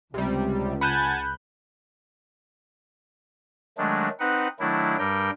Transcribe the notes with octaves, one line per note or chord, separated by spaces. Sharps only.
C#2 C3 G3
F#5 G#5 A5 B5 F#6 G6
D#3 F#3 G#3 A3 D4
C4 D#4 B4 F#5
D#3 F#3 A3 D4 E4
G2 G3 A#4 G5